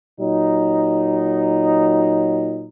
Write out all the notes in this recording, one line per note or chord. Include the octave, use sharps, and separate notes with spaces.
A#2 F#3 D#4